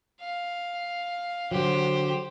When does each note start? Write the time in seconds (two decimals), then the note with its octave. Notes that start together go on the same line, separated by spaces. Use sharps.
0.21 F5
1.51 D3 F#3 G4 C5